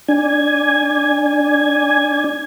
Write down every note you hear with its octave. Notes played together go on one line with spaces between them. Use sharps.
D4 G#5